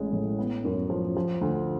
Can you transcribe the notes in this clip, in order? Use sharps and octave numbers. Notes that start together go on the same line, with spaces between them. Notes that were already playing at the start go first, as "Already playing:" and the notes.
Already playing: A1 G#3
A2
B3
F#2
F3
F3
D2